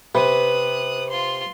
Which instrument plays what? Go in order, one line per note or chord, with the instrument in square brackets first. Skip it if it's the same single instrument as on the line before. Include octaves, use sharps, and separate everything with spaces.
[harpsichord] C3 [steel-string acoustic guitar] B4 [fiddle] D#6 F#6
[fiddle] F4 C6